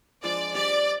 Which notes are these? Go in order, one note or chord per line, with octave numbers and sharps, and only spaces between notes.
F3 G#3 D4 D5
G3 D4 G4 D5